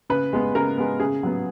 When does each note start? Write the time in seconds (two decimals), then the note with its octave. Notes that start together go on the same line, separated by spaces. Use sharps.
0.10 C#3 B4
0.33 G#3 B3
0.55 C#3 A#4
0.78 G#3 B3
1.00 C#3 G#4
1.23 F#3 B3